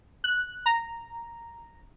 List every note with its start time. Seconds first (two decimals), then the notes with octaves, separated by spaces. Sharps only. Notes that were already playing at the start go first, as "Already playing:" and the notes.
0.24 F#6
0.66 A#5